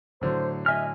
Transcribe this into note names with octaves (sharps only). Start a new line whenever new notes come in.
A2 D3 F#3 C5
D#5 E5 G#5 F6